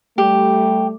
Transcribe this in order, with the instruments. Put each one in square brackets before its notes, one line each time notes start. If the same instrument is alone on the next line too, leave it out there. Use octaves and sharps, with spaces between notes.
[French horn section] G3 A3 [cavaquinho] G4